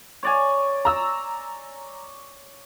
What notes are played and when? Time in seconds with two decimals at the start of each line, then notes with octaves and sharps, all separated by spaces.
0.23 C#5 D5 G#5
0.85 A#5 E6